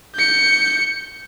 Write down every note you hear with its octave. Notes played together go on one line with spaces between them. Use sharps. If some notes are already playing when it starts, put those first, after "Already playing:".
G6 C#7